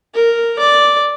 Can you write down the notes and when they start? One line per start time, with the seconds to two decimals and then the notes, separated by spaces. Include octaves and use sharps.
0.14 A#4
0.59 D5